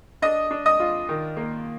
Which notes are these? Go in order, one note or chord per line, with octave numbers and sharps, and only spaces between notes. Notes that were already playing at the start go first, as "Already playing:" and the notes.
D4 D#5 D#6
D4
D#5 D#6
F4
D#3
A#3